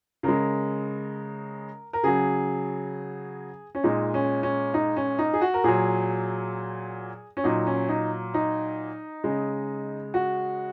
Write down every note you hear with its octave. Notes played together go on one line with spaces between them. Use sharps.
C#3 G#3 A#4
A#4
C#3 F#3 G#4
C#4
A#2 G#3 D#4
C#4
C#4
D#4
C#4
D#4
G#4
F#4
A#4
A#2 F#3 G#4
C#4
A#2 F#3 D#4
C#4
D#4
D#4
C#3 G#3
F#4